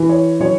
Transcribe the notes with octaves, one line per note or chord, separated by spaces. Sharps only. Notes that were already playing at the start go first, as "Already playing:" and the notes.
Already playing: E3
C#5
F#3 C#5